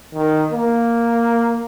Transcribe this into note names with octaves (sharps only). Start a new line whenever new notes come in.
D#3
A#3